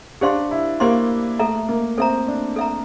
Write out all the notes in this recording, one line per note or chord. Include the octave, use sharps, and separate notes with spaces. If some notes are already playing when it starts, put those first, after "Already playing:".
D4 G4 C5 F5 C6
E4
A#3 G4 C5 F5 C6
A3 A4 E5 A#5
A#3
C4 A4 E5 A#5
D4
A4 E5 A#5